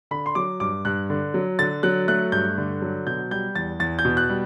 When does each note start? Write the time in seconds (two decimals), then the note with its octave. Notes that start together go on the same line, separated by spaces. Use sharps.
0.11 D3 B5
0.26 C6
0.35 F#3 D6
0.60 G2 D6
0.85 G2 F#6
1.10 D3
1.34 F#3
1.59 D3 A6
1.83 F#3 F#6
2.08 A3 F#6
2.32 G2 G6
2.58 D3
2.82 F#3
3.07 B2 G6
3.31 G3 G6
3.55 E2 A6
3.80 E2 A6
3.99 G6
4.05 B2
4.17 F#6
4.30 G3